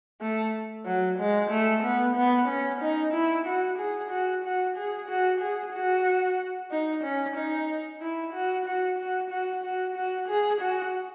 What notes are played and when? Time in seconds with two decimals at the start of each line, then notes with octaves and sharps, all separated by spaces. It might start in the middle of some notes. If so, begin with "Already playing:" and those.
0.21 A3
0.86 F#3
1.19 G#3
1.50 A3
1.83 B3
2.16 B3
2.48 C#4
2.81 D#4
3.13 E4
3.46 F#4
3.78 G#4
4.11 F#4
4.44 F#4
4.76 G#4
5.09 F#4
5.41 G#4
5.73 F#4
6.71 D#4
7.04 C#4
7.36 D#4
8.01 E4
8.34 F#4
8.66 F#4
8.98 F#4
9.31 F#4
9.64 F#4
9.96 F#4
10.28 G#4
10.61 F#4